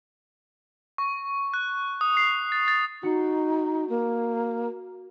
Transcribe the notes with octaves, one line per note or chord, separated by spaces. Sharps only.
C#6
F#6
D#6
C7
A6
A6
D#4 F#4 C#7
A#3